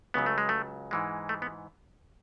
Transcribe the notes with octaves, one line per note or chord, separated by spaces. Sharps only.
C#2 C#3 F#3 B3
A3
G#3
A3
G#2 E3 G#3
A3
B3